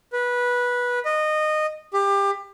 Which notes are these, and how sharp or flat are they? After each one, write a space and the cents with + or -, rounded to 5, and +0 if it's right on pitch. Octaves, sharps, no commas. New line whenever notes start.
B4 -15
D#5 -20
G4 +25